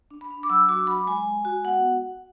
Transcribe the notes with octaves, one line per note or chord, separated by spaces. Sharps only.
D4
B5
D4
D6
F#3 E6
F#4 D6
F#3 B5
G#3 G#5
G#3
F#4
B3 F#5